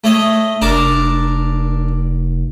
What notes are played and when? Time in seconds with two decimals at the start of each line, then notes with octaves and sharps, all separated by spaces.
0.04 A3 C#5 D#5
0.62 F1 D4 A#4 A5